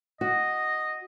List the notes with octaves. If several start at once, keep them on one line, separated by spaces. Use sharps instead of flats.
F#4 D#5